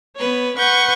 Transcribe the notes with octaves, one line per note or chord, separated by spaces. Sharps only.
B3 B4 C#5
B4 F#5 C#6 G6